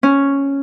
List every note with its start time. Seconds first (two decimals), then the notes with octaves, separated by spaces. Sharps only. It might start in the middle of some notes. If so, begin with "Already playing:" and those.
0.03 C#4